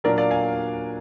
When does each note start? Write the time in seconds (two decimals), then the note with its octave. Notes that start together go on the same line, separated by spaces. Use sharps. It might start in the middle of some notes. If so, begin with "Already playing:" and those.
0.04 A#2 F#3 A#3 D4 A#4 D5
0.18 D5 F5
0.31 F5 G#5